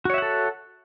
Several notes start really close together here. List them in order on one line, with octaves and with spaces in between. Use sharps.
F#4 C#5 E5 F#5 A4